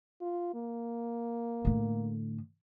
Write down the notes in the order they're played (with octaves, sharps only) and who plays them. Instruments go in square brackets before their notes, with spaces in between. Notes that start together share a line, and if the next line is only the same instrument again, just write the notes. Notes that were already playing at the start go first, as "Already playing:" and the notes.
[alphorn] F4
A#3
[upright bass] A2 D3